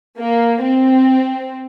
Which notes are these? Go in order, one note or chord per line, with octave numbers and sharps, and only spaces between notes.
A#3
C4